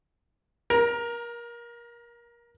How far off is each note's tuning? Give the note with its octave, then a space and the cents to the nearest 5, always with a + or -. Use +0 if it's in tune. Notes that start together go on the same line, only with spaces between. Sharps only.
A#4 +25 A#5 +0